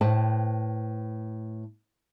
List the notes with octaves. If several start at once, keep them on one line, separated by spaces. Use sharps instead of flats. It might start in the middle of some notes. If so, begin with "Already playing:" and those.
A2 B4 C5 G5 A5